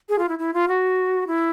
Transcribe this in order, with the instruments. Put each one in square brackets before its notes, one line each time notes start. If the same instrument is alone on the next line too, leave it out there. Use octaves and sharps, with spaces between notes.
[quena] G#4
F4
E4
E4
F4
F#4
E4